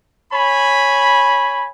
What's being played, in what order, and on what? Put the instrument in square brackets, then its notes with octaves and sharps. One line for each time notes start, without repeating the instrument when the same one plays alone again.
[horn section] C#5 G#5 B5